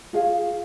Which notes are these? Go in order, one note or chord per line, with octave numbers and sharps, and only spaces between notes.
F4 G#4 C#5 F5